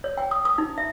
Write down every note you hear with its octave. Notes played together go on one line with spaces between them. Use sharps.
C#5
G5
D#6
D#6
D#4
E5